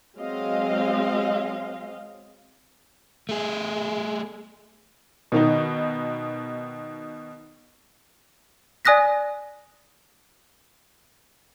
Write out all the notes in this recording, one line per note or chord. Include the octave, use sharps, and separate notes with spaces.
F#3 G#3 C4 D#5 F5
A3 G#4
B2 D#3 D#4
D5 G#5 D#6 F#6 A#6 B6